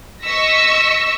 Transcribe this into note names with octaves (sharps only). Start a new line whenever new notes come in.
D#5 C#6 E6 A#6 B6